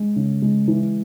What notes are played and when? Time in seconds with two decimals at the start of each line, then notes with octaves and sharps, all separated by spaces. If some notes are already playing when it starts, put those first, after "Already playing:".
Already playing: G#3
0.16 C#3
0.42 G#3
0.68 E3